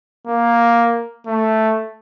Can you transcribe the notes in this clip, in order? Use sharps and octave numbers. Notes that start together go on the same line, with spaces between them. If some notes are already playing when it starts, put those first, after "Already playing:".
A#3
A3